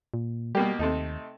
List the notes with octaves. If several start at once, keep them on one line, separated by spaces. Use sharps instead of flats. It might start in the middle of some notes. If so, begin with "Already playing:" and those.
A#2
B2 G3 A#3 G4
D#2 C3 A3 D#4